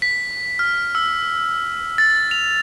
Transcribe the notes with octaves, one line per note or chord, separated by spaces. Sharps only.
B6
F6
E6
A6
F7